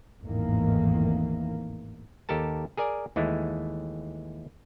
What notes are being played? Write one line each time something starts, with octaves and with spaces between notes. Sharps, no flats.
G#1 E2 A2 D#3 E3 A#3
D#2 G4 A4 A#4 A5
G#4 A#4 D5 G#5
D#2 E3 G#3 A3